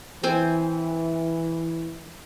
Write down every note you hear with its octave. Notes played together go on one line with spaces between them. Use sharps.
E3 C4 G5 G#5